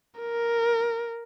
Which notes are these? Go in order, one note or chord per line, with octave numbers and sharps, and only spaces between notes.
A#4